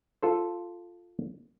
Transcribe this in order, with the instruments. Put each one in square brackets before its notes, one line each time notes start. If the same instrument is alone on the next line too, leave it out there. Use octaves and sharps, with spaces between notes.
[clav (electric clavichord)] F4 A4 C5